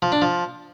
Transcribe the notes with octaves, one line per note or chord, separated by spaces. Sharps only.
F3
D4
F3